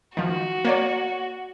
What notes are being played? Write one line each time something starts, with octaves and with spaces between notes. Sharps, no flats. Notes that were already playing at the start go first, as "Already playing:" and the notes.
D#3 F3 F#4
A#3 C#5 D5